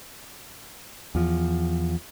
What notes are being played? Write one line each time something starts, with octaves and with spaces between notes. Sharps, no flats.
E2 F3